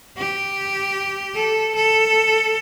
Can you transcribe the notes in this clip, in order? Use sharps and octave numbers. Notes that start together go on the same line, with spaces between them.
G4
A4
A4